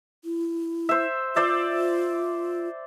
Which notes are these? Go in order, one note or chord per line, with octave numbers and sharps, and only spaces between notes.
E4
C5 E5
F4 C5 D5 E5